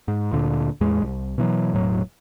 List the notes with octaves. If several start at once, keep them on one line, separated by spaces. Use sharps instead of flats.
G#2
D2 A#2 D3
E2 A2 G#3
C2
B2 E3 F#3
E1 A2 F#3